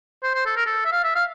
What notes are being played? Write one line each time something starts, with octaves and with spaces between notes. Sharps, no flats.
C5
C5
A4
A#4
A4
E5
F5
E5
F5